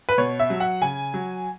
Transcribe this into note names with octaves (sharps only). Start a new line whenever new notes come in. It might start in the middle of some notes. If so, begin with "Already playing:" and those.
B4
B2 C#5
E5
F#3
F#5
C#3 G#5
F#3